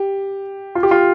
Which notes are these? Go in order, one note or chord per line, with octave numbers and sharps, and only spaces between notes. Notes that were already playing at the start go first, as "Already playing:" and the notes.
Already playing: G4
F4
G4
F4